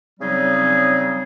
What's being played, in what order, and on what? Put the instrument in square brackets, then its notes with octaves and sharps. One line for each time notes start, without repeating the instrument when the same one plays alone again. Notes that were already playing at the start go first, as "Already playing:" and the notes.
[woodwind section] C#3 F#3 G3 C4 D#4 G#4